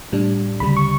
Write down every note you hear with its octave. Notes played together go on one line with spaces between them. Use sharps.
A2 G3 D4
D2 C#3 G3 B5
C#6